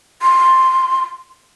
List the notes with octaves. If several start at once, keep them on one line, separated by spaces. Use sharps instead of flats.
C6